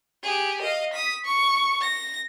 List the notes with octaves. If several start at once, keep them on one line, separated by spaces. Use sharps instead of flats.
G4 G#4
D#5 F5
D#6 B6
C#6
A#6